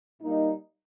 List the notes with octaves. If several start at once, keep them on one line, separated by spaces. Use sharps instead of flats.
A#2 G3 A#3 D#4